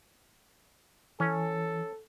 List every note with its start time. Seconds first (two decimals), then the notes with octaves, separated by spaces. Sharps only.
1.20 E3 C#4 A4